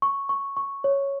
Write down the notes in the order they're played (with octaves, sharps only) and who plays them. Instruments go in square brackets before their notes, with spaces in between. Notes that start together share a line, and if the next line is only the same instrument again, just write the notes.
[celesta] C#6
C#6
C#6
C#5